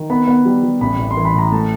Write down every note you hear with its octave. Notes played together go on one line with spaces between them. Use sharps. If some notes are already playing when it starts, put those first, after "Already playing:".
Already playing: D#3
B3 B5
B3
G3
G3
A1 B5
A1
C6
E3
B5
A2 A#5
A3 A5